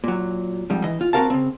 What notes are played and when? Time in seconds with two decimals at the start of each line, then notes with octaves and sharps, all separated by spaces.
0.04 A#2 F#3
0.70 F2 G#2 G3
0.84 E3 D#5
1.01 F4
1.13 C4 F#4 G4 A#4 F5 A5
1.30 C#3 C4